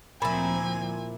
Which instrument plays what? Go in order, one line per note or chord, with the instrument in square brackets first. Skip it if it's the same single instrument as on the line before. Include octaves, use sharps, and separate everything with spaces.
[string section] D2 F3 C4 [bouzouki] A#2 E4 [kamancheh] G#5 [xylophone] B5